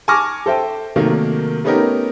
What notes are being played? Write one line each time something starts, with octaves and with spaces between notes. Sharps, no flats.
G#5 A5 C#6 D6 F6 A#6
A4 C5 E5 G5
C3 D#3 F#3 A3 A#3 A#4
A3 B3 C#4 D#4 G4 A#4